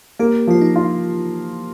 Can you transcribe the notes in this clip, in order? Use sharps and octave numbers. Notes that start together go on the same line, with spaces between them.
A#3 G4
F3 F4
D#4
F4